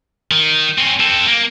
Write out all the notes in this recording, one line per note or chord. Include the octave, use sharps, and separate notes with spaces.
D#3
C4 C#4
C4 A4
A#3